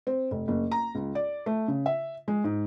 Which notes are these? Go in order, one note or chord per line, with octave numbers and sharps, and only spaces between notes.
C4
F1
F#1
A#5
C#2
D5
A3
C#3
E5
G#3
G#2